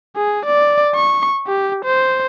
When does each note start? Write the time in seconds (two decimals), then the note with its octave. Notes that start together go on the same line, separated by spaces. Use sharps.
0.16 G#4
0.46 D5
0.96 C#6
1.47 G4
1.85 C5